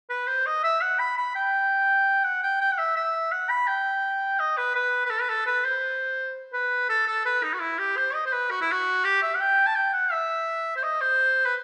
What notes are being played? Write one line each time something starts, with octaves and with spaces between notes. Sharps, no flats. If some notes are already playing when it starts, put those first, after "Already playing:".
B4
C5
D#5
E5
F#5
B5
B5
G5
F#5
G5
G5
F#5
E5
E5
F#5
B5
G5
D#5
B4
B4
B4
A4
B4
A4
B4
C5
B4
A4
A4
B4
D#4
F#4
E4
G4
C5
D#5
C5
B4
F#4
E4
F#4
G4
E5
F#5
G5
A5
G5
F#5
E5
C5
D#5
C5
B4